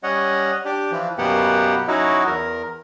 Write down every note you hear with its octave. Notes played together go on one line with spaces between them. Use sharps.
G3 C#4 C#5 D#5 F#5
D4 G4
E3 F3
F#2 B2 A#3 B3 G4 F#5
F#3 C#4 D#4 E4 F#4
E2 A#4